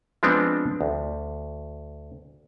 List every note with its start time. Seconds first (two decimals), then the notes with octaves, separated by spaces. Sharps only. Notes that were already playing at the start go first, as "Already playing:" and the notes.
0.23 F3 G#3 B3 C4 D4
0.81 D2